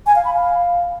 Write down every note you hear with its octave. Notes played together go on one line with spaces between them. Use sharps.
G#5
F5
B5
F5